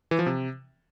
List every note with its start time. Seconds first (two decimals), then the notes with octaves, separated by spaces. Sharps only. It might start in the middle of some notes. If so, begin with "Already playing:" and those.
0.11 E3
0.19 F3
0.26 C3